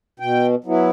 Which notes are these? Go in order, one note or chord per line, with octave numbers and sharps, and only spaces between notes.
B2 G5
F#3 B3 E4